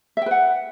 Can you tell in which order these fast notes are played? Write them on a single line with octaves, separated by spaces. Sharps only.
E5 G5 B4 F#5